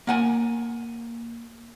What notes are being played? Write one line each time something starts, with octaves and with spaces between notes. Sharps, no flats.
A#3 F#5 G#5